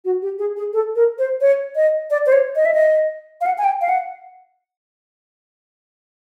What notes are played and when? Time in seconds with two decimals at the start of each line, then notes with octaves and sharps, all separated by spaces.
0.05 F#4
0.22 G4
0.39 G#4
0.57 G#4
0.73 A4
0.96 A#4
1.18 C5
1.41 C#5
1.76 D#5
2.11 D5
2.26 C5
2.32 C#5
2.56 D#5
2.65 E5
2.74 D#5
3.41 F5
3.46 F#5
3.58 G#5
3.64 G5
3.81 F5
3.89 F#5